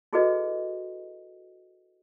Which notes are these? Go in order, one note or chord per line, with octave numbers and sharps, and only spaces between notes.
E4 F#4 G#4 A4 B4 D#5